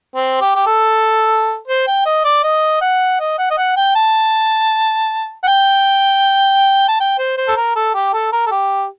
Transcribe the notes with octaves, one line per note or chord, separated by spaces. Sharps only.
C4
G4
G4
A4
C5
G5
D#5
D5
D#5
F#5
D#5
F#5
D#5
F#5
G5
A5
F#5
G5
A5
G5
C5
C5
A4
A#4
A4
G4
A4
A#4
A4
G4